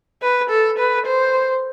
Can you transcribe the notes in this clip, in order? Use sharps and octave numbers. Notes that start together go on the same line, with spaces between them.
B4
A4
B4
C5